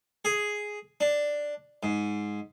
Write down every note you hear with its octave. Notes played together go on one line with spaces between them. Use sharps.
G#4
D4
G#2